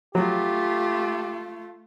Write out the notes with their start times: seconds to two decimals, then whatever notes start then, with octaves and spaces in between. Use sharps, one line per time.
0.15 F#3 A3 F4 G4